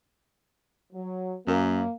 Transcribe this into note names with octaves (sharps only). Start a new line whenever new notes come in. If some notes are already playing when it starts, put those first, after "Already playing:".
F#3
F#2 A#3